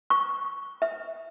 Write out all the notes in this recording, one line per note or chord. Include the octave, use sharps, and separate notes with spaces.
C#6
E5